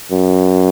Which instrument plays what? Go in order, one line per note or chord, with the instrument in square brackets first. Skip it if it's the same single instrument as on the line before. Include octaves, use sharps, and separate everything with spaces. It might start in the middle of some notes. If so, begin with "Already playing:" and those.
[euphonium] F#2